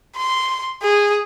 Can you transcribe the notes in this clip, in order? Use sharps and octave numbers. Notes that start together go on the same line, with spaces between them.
C6
G#4